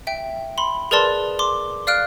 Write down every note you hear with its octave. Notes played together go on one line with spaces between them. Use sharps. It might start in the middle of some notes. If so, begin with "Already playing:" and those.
E5 G5
B5 C6
G#4 A#4 B4 D5 A5 C6
C6 D6
D5 F5 F6 F#6 D7